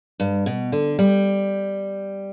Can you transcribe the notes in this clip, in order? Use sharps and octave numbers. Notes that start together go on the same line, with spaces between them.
G2
B2
D3
G3